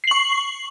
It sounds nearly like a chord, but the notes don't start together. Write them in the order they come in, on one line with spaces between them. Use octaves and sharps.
C7 F#7 C#6